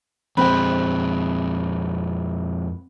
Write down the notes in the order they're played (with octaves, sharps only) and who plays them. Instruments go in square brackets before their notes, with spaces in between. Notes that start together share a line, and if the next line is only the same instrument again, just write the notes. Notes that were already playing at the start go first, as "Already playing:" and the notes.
[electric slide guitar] F2 G#3 [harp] C4 G5 [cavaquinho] B4